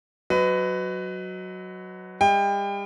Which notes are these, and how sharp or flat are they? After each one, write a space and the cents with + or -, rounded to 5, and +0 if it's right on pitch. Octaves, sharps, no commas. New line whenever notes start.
F#3 +0 B4 +25 D#5 +0
G3 +40 D#5 +40 G5 +30